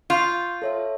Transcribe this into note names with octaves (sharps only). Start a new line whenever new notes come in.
F4 C6 C#6 G6
A4 C#5 E5